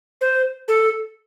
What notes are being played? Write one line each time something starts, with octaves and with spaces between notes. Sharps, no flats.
C5
A4